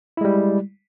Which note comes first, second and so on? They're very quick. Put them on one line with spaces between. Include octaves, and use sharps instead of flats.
E4 G#3 G3